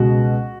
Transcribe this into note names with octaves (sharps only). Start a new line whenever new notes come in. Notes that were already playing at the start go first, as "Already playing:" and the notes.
Already playing: C#2 B2 G#3 F#4